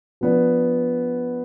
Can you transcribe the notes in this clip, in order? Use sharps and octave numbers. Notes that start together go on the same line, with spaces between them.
F3 B3 D4